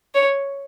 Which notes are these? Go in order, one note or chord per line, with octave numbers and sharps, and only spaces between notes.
C#5